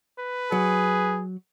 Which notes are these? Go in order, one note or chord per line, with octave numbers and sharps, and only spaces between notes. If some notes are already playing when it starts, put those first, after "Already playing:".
B4
F#3 G#4